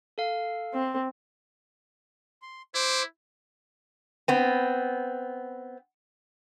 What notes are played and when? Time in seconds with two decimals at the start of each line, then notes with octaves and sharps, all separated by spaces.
0.18 A4 F5
0.74 C4
2.42 C6
2.75 E4 C5 D6
4.28 B3 C4